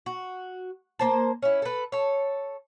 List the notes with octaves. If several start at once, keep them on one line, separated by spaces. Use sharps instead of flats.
F#4
A#3 C5 A5
C#4 E4
A4 B4
A4 C#5